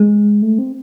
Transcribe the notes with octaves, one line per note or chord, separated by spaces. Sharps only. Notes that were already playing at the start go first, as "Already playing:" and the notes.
Already playing: G#3
A3
C4